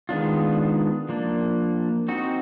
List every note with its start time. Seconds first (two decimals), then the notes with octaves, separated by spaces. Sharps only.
0.09 D#3 G#3 B3 D4 F4
1.09 F3 A#3 D4
2.08 C4 D#4 F#4